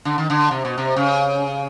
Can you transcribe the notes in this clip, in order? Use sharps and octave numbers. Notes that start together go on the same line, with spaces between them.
D3
D#3
D3
C3
B2
C3
C#3